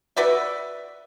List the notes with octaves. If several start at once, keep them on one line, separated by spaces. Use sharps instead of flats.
F#4 B4 D5 E5